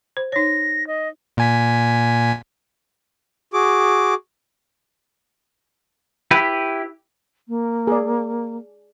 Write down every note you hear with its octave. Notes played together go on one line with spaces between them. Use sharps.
C5
D#4 C#5 A#6
D#5
A#2 G#5 B6
F#4 G#4 D6
E4 G4 B4
A#3
G#4 D5